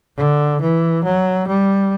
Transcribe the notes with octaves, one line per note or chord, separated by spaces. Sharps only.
D3
E3
F#3
G3